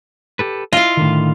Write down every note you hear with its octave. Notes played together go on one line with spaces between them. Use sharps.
G4 A4 B4
E4 F4 D#5 F5
A2 D3 D#3